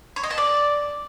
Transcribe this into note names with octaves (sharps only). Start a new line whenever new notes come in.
C#5
D#5
A5
D5